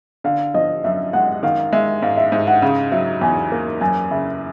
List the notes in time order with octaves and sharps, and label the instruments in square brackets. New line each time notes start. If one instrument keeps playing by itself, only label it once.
[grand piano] D3 [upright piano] F5
[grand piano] F3 [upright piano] D#5
[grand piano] F#2 [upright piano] E5
[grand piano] G#3 [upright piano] F#5
[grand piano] D#3 [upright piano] F5
[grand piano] G#3 [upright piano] E5
[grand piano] G#2 [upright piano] F5
[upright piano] E5
[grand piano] G#2 [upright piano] E5
[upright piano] F#5
[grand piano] C#3 [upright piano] F5
[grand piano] F#3 [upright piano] E5
[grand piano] E2 [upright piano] G#5
[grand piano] A#3
[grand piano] F#2 [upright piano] G#5
[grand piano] C#3 [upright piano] E5